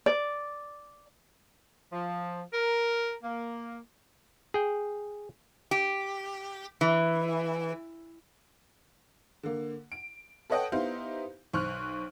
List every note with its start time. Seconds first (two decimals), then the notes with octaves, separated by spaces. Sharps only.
0.06 D5
1.93 F3
2.53 A#4
3.23 A#3
4.54 G#4 G5
5.71 G4
6.81 E3
9.43 D3 A#3
9.92 D7
10.50 A4 B4 C#5 D#5 F#5 G5
10.72 B3 D#4 E4 G4 C5 F5
11.53 B1 C5 C#6 F6 F#6